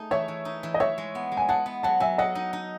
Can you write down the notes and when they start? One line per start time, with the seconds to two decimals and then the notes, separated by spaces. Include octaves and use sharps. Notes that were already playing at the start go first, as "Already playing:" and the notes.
Already playing: A3 D#4 G#4
0.11 E3 C#5 E5
0.28 E3
0.45 D#4
0.63 E3
0.74 D#5
0.80 E3 C#5 E5
0.98 G#3
1.15 B3
1.32 G#3
1.37 G#5
1.49 G#4 F#5 A5
1.66 B3
1.83 F#3 F#5 A5
2.00 F#3 E5 G#5
2.18 A4 D#5 F#5
2.35 D#4
2.53 D#4